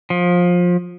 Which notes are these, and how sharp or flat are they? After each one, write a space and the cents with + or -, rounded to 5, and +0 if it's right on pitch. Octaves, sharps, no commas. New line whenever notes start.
F3 +20